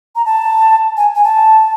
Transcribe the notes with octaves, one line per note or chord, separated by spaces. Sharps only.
A#5
A5
G#5
G#5
A5